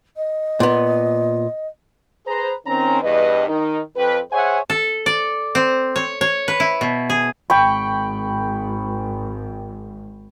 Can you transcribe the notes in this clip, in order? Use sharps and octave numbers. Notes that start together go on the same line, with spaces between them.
D#5
A#2 B3
G#4 B4 C5 A#5
D#3 C4 C#4 A#5
E2 G2 B4 D#5
D#3 D#4 A#4
F2 B4 G5
G#4 C5 C#5 E5 F#5 G#5
A4
D5
C4
C#5
C#5
B4
E4
B2
G#4
G#1 G5 B5 C#6